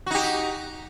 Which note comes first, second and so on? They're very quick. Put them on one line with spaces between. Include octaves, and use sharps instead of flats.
F#4 D#4 G4